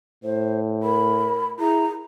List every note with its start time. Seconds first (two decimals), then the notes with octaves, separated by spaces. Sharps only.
0.24 A2 C5
0.83 A#4 B5
1.60 E4 G#4 A#5